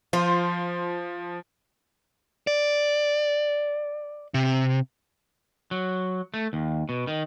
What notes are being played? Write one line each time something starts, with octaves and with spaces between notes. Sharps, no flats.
F3 F4 C5
D5
C3
F#3
A3
D#2
B2
D#3